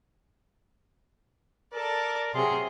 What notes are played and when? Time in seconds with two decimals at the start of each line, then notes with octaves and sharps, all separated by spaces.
1.74 A4 A#4 D5
2.34 C3 F#3 G#4 C6